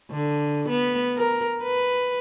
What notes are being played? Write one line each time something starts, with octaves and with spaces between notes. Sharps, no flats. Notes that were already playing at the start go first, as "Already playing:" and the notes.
D3
B3
A#4
B4